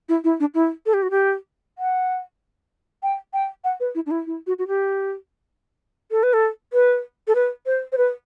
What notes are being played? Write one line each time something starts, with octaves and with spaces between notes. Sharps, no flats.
E4
E4
D4
E4
A4
G4
F#4
G4
F#5
G5
G5
F#5
B4
E4
D4
E4
E4
F#4
F#4
G4
A4
B4
A4
B4
A4
B4
C5
C5
B4